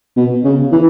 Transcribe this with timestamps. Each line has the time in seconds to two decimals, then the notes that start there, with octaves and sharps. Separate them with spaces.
0.17 B2
0.44 C#3
0.72 E3